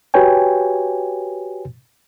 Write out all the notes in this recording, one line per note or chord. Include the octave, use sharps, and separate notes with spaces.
F#4 G4 B4 C#5 G5 G#5